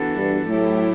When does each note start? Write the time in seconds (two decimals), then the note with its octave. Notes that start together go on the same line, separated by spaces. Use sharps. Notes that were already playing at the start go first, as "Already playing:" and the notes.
Already playing: E3 B3 D4 F#4 A4
0.16 G2
0.48 A2 F#3 A3 E4 G4